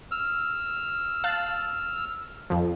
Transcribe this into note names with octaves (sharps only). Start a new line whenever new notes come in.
E6 F6
F5 A5 F#6
F2 F3